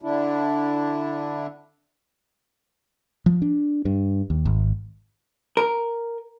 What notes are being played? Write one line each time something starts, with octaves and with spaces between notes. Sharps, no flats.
D3 D4 E4
F3
D4
G2
D#2
G#1
A#4